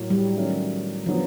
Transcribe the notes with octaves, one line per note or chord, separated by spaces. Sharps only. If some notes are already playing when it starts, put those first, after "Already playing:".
Already playing: A2 F#3 A#3
G3
D#3 F#3 A3 C#4
D3 F3 F#3 B3